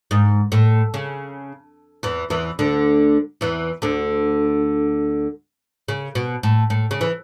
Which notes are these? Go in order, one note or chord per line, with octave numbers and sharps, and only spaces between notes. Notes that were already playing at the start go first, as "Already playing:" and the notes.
G#2
A2
C#3
E2 E3
E2 E3
D2 D3
E2 E3
D2 D3
C#3
B2
A2
A2
C#3
E3